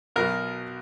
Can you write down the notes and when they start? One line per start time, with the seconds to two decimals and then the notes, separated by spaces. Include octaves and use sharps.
0.16 B1 B2 F#3 A#4